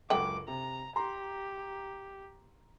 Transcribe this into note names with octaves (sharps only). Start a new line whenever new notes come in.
C#2 F#2 D3 G5 D6 F#7
C3 A#5
G4 A#5 C6